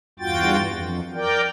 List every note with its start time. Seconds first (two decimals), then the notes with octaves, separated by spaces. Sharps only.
0.19 E2 G2 F4 F#4 G5 A6
0.70 F2
1.15 A#4 D5 G5